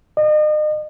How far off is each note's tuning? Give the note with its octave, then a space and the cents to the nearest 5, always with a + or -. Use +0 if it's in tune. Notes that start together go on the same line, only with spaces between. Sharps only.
D#5 -40